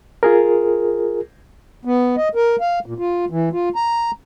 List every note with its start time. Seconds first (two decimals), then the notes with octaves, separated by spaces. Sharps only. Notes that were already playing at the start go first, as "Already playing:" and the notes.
0.23 F4 G#4 A#4
1.85 B3
2.17 D#5
2.35 A#4
2.61 F5
2.86 A#2
2.98 F4
3.30 E3
3.53 F4
3.76 A#5